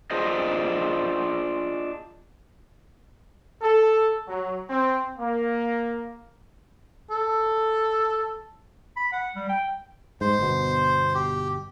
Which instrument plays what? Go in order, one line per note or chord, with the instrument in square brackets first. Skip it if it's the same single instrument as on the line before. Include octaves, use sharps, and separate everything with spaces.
[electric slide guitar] D4 F4 G#4 C5 D#5
[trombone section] A4
F#3
C4
A#3
[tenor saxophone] A4
[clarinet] B5
F#5
G3
G5
[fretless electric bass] G#2 [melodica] C5
[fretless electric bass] G1 B2
[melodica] G4